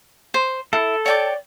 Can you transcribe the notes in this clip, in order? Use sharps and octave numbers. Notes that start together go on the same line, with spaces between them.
C5
E4 A4
C#5 D5 G5 D6